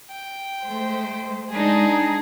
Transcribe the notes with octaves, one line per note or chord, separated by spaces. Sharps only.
G5
G#3 A3 C5
G#3 D4 D#4 G#4